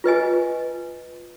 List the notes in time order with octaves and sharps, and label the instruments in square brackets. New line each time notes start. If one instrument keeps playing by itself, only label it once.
[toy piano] F4 B4 D#5 G#5